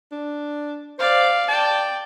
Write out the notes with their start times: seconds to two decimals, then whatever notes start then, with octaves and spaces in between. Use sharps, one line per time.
0.12 D4
0.99 C5 D5 F5
1.49 D5 G5 A5